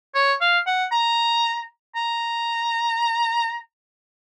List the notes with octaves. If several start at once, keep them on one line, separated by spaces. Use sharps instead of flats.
C#5
F5
F#5
A#5
A#5